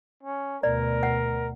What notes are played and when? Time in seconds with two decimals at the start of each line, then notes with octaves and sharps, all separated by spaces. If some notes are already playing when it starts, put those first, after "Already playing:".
0.23 C#4
0.63 D2 B2 A#4 D5
1.03 F#5